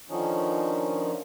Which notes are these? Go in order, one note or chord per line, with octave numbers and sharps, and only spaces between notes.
D3 D#3 F3 C#4 D#4